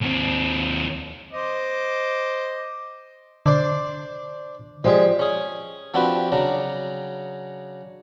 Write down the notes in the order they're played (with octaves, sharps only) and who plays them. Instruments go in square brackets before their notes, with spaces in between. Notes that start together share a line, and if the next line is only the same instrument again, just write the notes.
[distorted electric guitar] D#2 C4
[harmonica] C5 D#5 D6
[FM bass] D3 [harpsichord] D4 C5 D5
[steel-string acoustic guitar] F3 G4 [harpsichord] G#3 G#4 [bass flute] D5
[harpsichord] C#4 G#4
F3 C4 D4 F#4 G4 B4
C#3 F#3 D4 A#5